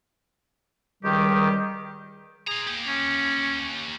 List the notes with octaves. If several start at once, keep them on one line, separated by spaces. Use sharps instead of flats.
C#2 D#3 G3 G4
G#4 C5 A#5
A#3 G4
C#4